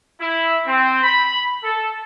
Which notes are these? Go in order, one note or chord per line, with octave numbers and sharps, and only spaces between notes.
E4
C4
B5
A4